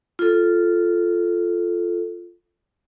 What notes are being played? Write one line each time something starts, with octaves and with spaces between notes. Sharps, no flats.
F4 A4